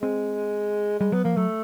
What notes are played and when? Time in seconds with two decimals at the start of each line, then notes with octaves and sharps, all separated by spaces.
0.02 G#3 C4
1.00 G3 G#3
1.12 F#3 B3
1.24 F3 A#3
1.36 F#3 A3